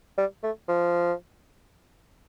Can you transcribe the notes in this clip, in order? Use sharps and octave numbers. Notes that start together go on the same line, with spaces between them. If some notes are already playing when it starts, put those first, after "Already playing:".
G3
A3
F3